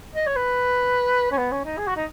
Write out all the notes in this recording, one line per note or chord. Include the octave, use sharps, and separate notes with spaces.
D#5
C#5
B4
C#4
B3
C#4
D#4
G#4
F#4
D#4